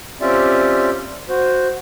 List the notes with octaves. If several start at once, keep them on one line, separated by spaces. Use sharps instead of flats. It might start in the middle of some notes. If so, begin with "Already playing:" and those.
C4 C#4 F4 G4 D5 E5
F#4 C5